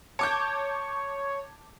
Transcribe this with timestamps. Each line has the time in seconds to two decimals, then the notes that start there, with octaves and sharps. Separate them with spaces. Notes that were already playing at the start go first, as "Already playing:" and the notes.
0.19 C#5 A5 D6 G6